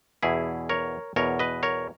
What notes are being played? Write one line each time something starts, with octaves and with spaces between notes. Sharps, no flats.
E2 B2 E4 G#4
A#4 C#5
E2 B2 A#4 C#5
B4 D#5
A#4 C#5